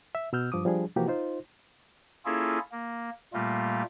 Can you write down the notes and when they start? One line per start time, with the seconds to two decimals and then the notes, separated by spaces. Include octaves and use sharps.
0.15 E5
0.33 B2 B3 E6 F6 G6
0.52 G2 F3 D6 D#6
0.65 F3 G3 D4 G#4
0.96 C3 E3 F3 A#3 F#4 G4
1.08 D#4 F4 C5
2.25 A#3 C#4 E4 F4 G#4 A4
2.72 A#3
3.33 A#2 G3 A3 A#3 F4